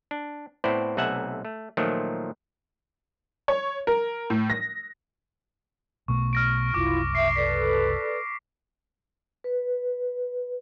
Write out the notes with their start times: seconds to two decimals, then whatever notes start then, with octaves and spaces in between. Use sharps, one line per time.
0.11 D4
0.64 A2 B3 C4 E4 C5 D5
0.97 B1 C3 A3 E5 F#5 G#5
1.45 A3
1.77 A#2 D#3 F3 F#3 A3
3.48 C#5
3.87 A#4
4.30 A2
4.50 A#6
6.08 B1 B2 A3 C#6
6.33 F6 A#6 D7
6.74 F#1 C2 E4 F4 D6 F6
7.15 E5 C7
7.36 A4 B4 D5 B6
9.44 B4